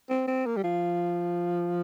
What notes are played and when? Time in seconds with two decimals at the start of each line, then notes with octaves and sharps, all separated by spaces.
0.10 C4
0.28 C4
0.46 A#3
0.57 G3
0.64 F3